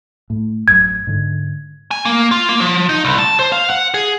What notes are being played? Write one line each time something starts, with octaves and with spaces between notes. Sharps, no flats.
A2
A1 F#2 G#6
G#2 D3
G#5
A#3
F4
A#3
F3
D#4
C2
A5
C5
F5
F#5
G#4